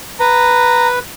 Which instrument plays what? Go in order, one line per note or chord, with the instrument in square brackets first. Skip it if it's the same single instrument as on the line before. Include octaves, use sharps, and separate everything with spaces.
[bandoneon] B4 [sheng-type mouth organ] A#5